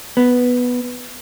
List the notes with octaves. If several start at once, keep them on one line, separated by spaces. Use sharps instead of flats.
B3